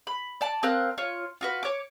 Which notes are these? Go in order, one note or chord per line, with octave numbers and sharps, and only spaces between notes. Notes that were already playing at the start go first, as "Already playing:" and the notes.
B5
D5 A5
C4 A#4 F5 F#6
F4 C#5
F4 F#4 B4
C#5 D6